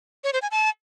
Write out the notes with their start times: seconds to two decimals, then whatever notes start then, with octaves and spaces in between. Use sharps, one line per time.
0.24 C#5
0.33 C5
0.42 G#5
0.51 A5